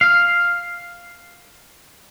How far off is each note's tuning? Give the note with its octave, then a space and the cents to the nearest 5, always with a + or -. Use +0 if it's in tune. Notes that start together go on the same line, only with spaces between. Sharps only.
F5 +0